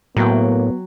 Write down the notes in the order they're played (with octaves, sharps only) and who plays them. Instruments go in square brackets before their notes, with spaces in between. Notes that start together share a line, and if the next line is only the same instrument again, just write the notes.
[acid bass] A2 [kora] F#3 G5 [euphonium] A#3 [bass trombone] B3